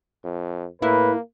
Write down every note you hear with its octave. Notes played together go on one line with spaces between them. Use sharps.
F2
A2 A#3 E4 B4